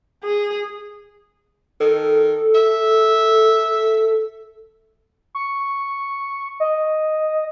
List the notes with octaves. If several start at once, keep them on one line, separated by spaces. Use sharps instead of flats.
G#4
D#3 A4
E5
C#6
D#5